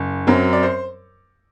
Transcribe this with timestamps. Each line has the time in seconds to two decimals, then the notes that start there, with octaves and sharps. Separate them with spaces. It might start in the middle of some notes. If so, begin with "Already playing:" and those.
Already playing: F#1
0.27 F#2 F#3 C4
0.53 D5
0.63 C5